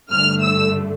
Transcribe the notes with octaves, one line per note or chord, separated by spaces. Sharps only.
G2 D3 A3 F6
E6